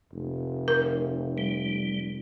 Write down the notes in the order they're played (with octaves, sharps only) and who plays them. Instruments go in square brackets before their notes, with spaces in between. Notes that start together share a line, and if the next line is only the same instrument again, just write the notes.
[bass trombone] F1
[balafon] A#4
[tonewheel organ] G3